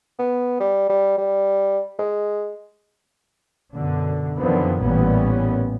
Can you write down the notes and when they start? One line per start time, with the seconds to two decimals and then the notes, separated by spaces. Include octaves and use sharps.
0.19 B3
0.60 G3
0.90 G3
1.18 G3
1.99 G#3
3.73 F#2 B2 D3
4.37 F#2 D3 D#3 F3 B3 C4
4.81 A1 A#2 E3 G3 B3 C#4